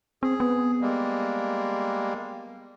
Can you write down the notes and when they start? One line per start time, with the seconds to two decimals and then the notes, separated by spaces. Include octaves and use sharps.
0.23 C4 G#4
0.40 B3
0.81 G3 G#3 A#3